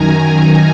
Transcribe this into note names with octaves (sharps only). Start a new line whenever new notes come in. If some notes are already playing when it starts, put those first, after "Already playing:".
Already playing: F#2 D#3 G#5 A#5